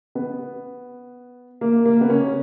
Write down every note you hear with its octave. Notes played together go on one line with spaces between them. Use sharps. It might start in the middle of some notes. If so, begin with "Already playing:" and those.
B3
A#3
A#3
B3
C#3 C#4